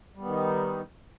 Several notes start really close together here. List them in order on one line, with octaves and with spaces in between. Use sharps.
G3 B3 D#3 D#4